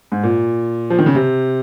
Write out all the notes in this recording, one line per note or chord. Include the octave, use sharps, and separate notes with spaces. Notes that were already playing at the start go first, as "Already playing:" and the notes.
G#2
A#2
F3
D#3
C#3
C3